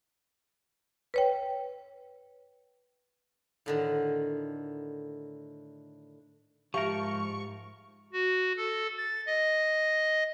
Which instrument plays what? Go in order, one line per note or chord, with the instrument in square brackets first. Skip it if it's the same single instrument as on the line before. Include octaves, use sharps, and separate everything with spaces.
[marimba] B4 C#5 G5
[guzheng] A2 D3 D#3
[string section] G#2 [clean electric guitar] F3 A#4 [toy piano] G4 E5 F5 [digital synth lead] C#6
[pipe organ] F#4
A4
A6
D#5